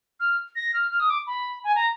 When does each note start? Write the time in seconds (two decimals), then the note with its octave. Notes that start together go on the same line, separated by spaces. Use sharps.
0.20 F6
0.56 A#6
0.74 F6
0.91 F6
1.00 D#6
1.10 D6
1.27 B5
1.64 G#5
1.76 A#5